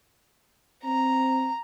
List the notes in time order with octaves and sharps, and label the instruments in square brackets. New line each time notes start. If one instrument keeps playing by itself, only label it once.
[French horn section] C4 [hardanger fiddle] A#5